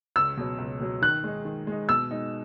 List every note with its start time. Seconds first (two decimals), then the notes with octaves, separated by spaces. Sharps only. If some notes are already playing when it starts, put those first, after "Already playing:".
0.16 C#2 E6
0.37 B2 F#3
0.58 C#2
0.80 B2 F#3
1.02 D#3 F#6
1.24 G#3 D#4
1.45 D#3
1.67 G#3 D#4
1.89 B2 E6
2.11 G#3 D#4